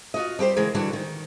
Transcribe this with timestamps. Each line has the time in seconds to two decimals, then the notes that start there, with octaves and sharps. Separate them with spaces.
0.14 F4 F#4 D#5
0.39 G3 G4 B4 C5
0.56 C#3 E3 G#3 A#4
0.74 D3 E3 G3 D4 F#4
0.93 D#3